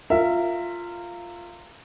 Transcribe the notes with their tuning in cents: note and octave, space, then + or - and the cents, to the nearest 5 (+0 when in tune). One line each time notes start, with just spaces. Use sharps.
F4 +0 A#4 -20 E5 +5